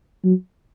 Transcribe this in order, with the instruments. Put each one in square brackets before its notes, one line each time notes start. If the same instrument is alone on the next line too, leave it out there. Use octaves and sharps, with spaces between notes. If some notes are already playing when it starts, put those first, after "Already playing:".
[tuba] F#3